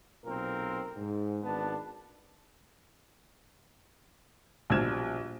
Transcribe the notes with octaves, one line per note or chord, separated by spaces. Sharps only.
B1 A#2 C4 A#4
G#2
G#1 B3 D4 A5
A#1 B2 G3 F6 G#6 E7